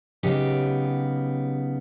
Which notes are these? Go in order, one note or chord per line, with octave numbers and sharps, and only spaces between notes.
C#3 F#3 B3 D#4 G4 G5